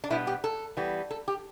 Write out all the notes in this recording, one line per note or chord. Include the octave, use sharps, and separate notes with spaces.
D4
B2 G3 B3 E4
G4
A4
E3 G3 B3
A4
G4